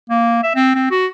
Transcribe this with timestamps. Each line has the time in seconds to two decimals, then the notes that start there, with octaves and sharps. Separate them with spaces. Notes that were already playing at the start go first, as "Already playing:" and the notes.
0.10 A#3
0.43 E5
0.55 C4
0.75 C4
0.91 F#4